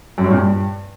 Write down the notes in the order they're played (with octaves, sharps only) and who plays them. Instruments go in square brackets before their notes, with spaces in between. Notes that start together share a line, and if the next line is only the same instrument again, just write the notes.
[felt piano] F#2
G2
A#2
G2